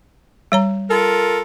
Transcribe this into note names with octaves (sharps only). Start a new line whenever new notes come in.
G3 C#5 A#5
F4 A4 A#4